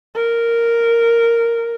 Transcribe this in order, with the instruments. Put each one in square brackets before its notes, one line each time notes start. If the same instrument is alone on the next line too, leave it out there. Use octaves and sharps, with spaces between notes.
[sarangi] A#4